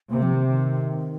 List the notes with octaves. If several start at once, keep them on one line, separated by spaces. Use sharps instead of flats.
C3 A#3
F3
D#3
D#3